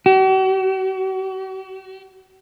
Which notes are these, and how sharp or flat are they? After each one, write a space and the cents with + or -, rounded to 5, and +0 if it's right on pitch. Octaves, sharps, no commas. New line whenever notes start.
F#4 +45